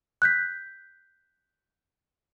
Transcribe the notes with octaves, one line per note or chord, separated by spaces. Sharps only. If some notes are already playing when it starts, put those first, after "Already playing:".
F#6 G6 B6